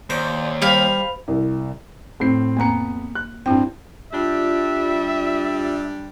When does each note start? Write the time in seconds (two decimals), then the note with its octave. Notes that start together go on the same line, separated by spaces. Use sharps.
0.10 D#2 C5 D5
0.62 G3 C5 F5 B5
1.28 C2
2.20 A2 C4 C7
2.57 F2 A#3 B3 A#5 C#7
3.15 F#6
3.46 G2 C4 E4 G5
4.13 G3 D4 F4 G4 E5